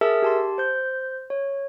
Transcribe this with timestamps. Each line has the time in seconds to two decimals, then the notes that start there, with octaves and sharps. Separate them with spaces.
0.01 G#4 A#4 E5 A5 E6
0.22 G4 A5 C6
0.58 C5 G6
1.30 C#5